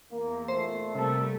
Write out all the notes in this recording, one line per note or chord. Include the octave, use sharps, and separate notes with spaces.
E2 A#3
A#2 A3 C5
C3 G3 A3 A#3 C4 A4